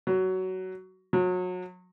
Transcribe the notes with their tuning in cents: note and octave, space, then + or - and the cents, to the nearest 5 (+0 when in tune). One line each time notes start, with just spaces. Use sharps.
F#3 +15
F#3 -30